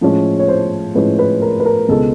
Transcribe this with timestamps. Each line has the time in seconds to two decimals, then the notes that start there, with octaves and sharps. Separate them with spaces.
0.01 A2 F3 G#3 C#4
0.39 C#5
0.48 C5
0.95 A2 F3 G#3 C#4 B4
1.19 B4
1.42 A#4
1.60 B4
1.65 A#4
1.88 C#2 B2 G#3 B3 A4